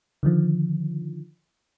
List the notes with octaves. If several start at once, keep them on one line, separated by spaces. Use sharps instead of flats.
D3 D#3 F3